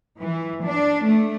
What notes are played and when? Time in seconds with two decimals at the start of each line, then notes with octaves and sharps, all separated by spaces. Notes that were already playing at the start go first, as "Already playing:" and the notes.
0.20 E3
0.64 D4
1.06 A3